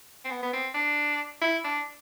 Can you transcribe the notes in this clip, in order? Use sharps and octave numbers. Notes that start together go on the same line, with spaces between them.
C4
B3
B3
C4
D4
E4
D4